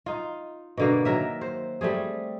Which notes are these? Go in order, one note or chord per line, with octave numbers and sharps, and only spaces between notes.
D#4 F4
B2 D3 A#3
D#3 F#3 A#4 E5
C5
G3 A3 C4 G#4